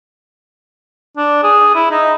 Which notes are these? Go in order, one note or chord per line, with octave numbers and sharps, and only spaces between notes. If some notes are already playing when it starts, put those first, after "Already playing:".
D4
G#4
E4
D#4